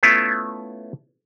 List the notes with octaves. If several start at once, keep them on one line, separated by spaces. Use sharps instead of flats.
A3 B3 C#4 E4 F4